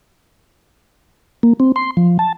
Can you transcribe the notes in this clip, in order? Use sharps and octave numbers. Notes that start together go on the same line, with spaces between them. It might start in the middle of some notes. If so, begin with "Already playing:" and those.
A#3
C4
C6
F3
A5